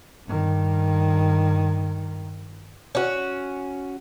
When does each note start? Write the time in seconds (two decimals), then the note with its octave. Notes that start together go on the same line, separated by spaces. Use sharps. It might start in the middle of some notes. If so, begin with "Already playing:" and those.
0.26 G2 D#3
2.95 C#4 F#4